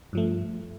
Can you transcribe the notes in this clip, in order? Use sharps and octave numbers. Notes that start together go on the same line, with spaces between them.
G2 F3 A3